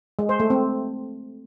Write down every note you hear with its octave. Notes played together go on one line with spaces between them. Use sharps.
G#3
C5
A3
C4